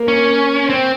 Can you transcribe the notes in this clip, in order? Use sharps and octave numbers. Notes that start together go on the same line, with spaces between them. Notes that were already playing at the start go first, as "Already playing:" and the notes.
Already playing: A#3
C#4
C4